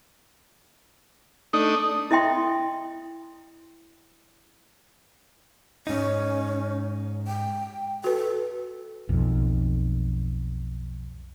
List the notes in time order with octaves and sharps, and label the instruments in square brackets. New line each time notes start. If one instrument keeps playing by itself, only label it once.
[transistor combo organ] A3 D4 D#4 [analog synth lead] D#6
[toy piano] E4 D#5 E5 G5 C6
[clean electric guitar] G#2 D#4 [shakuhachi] C#4
[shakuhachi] G5
[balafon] F#4 B4 [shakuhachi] A4
[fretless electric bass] B1 F2